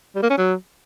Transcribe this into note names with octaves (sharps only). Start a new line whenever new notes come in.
G3
A#3
C#4
F#3